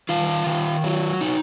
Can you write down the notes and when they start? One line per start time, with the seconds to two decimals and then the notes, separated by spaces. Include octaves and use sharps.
0.09 D#3 F4 F5
0.46 D#3
0.84 F#3
1.21 D#4